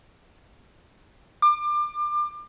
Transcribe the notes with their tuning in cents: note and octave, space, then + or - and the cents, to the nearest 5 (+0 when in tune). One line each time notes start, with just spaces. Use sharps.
D6 +30